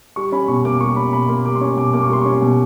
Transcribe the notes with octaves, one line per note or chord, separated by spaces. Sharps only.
G3 C#6
C#4 B5
B2 C#6
A#3 D6
G3 C#6
C#4 B5
B2 B5
A#3 C6
G3 D6
C6
C#4 C#6
B2 D6
A#3 D6
C#6
G3 C6
C#4 C#6
B2